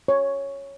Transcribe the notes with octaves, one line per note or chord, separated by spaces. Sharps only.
C#5